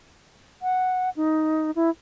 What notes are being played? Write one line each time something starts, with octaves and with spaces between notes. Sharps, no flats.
F#5
D#4
E4